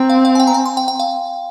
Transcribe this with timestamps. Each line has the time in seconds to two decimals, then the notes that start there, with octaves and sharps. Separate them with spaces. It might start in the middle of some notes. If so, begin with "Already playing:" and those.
Already playing: C4 G5 A#5
0.10 F5
0.25 F5
0.35 G#5
0.40 G5
0.47 A#5
0.54 G#5
0.66 C6
0.77 G5
0.88 G5
1.00 F5